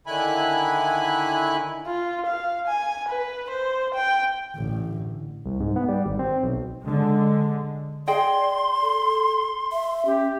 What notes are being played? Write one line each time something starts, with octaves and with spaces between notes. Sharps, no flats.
D3 D#3 E4 G#5 B5 F#6
F4
F5
G#5
B4
C5
G5
A1 D3
C2
G#2
B3
G3
G#1
C4
B1
D3 G#3
G#4 D5 D#5 G5 C6
A4
E5
C#4 G4